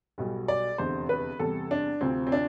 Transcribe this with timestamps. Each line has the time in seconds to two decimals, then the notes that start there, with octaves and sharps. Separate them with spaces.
0.18 B1 B2 G3
0.48 D5
0.78 F1 E2 D3 C5
1.09 B4
1.39 E2 C3 G3 A4
1.71 D4
2.01 D2 C3 F3 C4
2.27 C4
2.32 D4